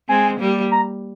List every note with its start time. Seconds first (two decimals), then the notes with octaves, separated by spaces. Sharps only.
0.09 G#3 C4 G#5
0.39 G3 A#3
0.72 A#5